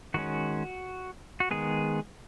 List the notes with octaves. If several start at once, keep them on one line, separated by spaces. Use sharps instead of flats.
D#3 G#3 C#4 F#4
F#4
D#3 G#3 B3 G#4